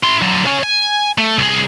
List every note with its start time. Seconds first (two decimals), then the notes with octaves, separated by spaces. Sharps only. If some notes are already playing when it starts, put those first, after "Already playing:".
0.03 E4 C6
0.22 D3 F#3
0.45 C#3 C#4
0.63 G#5
1.18 A3
1.38 C2 G#4